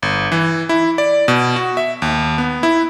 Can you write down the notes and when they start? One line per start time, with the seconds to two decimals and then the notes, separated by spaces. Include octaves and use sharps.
0.02 G1
0.32 E3
0.69 E4
0.98 D5
1.28 B2
1.56 F#4
1.77 E5
2.02 D#2
2.38 B3
2.63 E4